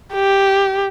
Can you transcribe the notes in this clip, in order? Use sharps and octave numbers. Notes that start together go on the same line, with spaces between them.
G4